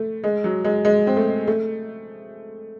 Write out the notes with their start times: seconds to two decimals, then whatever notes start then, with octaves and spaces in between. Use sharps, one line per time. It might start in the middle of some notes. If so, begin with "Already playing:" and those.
Already playing: A3
0.24 G#3
0.44 F#3
0.64 G#3
0.85 G#3
1.07 C4
1.17 A3
1.48 A3